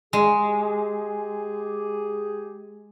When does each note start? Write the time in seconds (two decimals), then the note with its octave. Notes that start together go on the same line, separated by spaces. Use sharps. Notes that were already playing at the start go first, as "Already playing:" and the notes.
0.13 G#3 G4 G#4